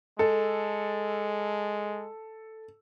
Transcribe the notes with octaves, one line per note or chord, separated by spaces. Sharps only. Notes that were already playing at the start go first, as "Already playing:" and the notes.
G#3 A4